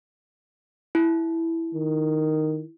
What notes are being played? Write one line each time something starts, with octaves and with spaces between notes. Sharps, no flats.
E4
D#3